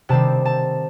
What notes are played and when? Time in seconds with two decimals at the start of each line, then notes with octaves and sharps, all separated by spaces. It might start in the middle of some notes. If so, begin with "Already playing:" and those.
0.09 C3 D#3 G3 C4 A5
0.45 A5